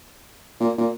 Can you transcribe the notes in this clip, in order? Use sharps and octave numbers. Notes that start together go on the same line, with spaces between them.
A#2
A#2